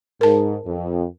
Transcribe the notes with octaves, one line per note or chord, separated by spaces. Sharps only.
G#2 A#4 A5
F2